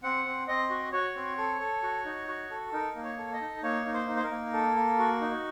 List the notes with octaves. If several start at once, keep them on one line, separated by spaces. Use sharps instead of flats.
C4 F#5
C4
C4 D#5
F#4
F#4 C#5
C4
A4
A4
F#4
D#4
F#4
A4
D#4 A#4
A#3
C#5
A4
D#5
D#4
A#3 C#5
D#4
C5
D#4
C5
A#4
A#3
A4
A#3
F#4
D#4